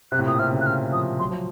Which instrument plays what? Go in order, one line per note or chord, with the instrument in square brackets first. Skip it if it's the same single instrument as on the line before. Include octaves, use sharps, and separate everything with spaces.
[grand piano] C3 [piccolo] F#6
[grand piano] A2
[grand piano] A#2 [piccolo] D#6
[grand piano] C3 [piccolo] F6
[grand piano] C#3
[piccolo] F#6
[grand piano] C#3 [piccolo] F6
[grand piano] F3 [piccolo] D#6
[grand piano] F#3 [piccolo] C6
[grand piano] F3